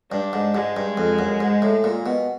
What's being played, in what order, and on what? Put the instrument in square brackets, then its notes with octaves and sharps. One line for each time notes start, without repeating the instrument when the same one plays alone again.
[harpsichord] G2 [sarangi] D4
[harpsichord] G#2
[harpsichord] G#2 [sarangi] G#3
[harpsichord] G2
F2
F#2
G#2
A2
A#2
B2